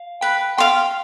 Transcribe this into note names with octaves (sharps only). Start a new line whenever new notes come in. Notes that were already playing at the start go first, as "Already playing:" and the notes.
Already playing: F5
B4 G5
F5 G5 C6